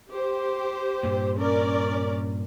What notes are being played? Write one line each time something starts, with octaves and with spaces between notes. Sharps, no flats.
G4 C5
G2 A#2
C#4 A#4 D5